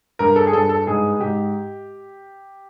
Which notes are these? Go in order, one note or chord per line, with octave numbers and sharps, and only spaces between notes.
G2 A#4
A4
G#4
G2 A4
A4
G#2 G#4
G#2 G4